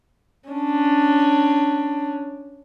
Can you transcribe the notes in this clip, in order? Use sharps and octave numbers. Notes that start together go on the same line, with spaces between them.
C#4 D4